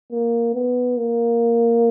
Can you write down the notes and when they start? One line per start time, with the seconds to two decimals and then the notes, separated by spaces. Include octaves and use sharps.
0.12 A#3
0.54 B3
0.98 A#3